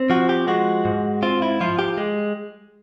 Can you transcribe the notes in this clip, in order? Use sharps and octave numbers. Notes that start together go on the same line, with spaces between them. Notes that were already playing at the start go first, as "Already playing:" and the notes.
Already playing: C4
F3 F#4
G4
G#3 F#4
G#2
C4 F4
E4
F3 F4
G4
G#3